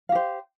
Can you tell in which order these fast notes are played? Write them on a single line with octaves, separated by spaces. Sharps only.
F5 G4 C5